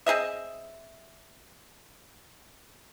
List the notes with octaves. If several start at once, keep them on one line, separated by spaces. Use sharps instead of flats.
C4 G#4 D#5 E5